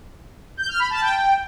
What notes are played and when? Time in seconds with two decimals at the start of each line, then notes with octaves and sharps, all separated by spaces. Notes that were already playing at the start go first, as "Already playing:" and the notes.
0.57 G6
0.68 F6
0.79 B5
0.90 A5
1.02 G5